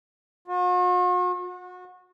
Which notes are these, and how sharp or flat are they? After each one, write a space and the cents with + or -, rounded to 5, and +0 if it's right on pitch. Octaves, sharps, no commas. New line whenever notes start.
F#4 -45
F#4 -30